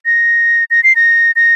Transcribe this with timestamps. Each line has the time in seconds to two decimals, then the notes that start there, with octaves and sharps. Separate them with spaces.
0.06 A#6
0.71 A#6
0.84 C7
0.96 A#6
1.36 A#6